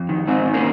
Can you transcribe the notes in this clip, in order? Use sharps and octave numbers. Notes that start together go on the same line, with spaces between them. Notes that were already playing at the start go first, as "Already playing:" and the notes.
Already playing: F2
D#3
G#2 C4 D#4
D#3
A#3 C#4